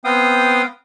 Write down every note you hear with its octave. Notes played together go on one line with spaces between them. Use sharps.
B3 C4 F5 G5 D#6